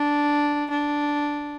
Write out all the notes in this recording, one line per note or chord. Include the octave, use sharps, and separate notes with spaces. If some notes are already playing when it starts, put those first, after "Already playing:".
Already playing: D4
D4